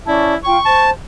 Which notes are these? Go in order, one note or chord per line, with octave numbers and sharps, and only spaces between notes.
C#4 E4 D5 A5
F4 G5 C#6
C5 A5